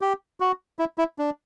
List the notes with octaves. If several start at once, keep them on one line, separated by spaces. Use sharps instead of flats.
G4
F#4
E4
E4
D4